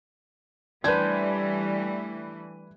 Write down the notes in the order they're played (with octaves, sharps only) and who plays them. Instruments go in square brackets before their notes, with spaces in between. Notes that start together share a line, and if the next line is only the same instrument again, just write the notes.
[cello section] E3 G3 A3 [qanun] D4 C5 G5 [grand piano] B4 G#6